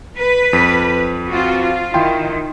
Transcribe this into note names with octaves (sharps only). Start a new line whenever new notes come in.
B4
F2
C4 F4 F#4
F4
D#3 E4 G5 C6